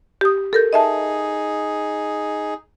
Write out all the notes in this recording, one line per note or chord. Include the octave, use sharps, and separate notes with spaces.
G4 D#6
A4 A#4 G6
D#4 G#4 D#5 E5 A5